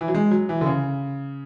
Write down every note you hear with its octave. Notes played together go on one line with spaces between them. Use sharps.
E3
F#3
G#3
F#3
E3
D3
C#3